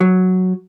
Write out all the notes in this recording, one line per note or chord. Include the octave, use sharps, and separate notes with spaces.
F#3